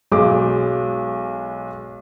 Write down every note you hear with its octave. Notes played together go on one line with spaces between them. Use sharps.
B1 G#3 D6